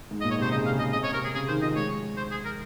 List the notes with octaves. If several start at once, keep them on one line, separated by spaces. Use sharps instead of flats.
G#2
D#5
A#2
C#5
C3 C5
C#3 D#5
F5
C#3
D#5
C3 D#5
C#5
C3 A#4
G#4
C#3 G#4
D#3 C5
F3 D#5
G#3 C#5
C5
G#4
A#4